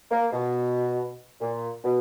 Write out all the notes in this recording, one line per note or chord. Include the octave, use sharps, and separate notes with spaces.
A#3
B2
A#2
B2